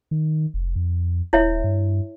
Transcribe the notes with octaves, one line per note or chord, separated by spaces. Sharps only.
D#3
F1
F2
D#1 E4 C#5 E5
G2